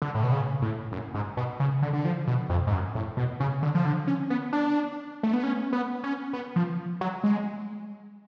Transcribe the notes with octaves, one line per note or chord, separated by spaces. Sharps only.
D3
A2
B2
C#3
A2
F#2
G#2
B2
C#3
D3
D3
F3
B2
F2
G#2
F#2
A2
B2
C#3
D3
F3
D3
C#4
B3
D4
A3
B3
C#4
B3
C#4
B3
F3
F#3
G#3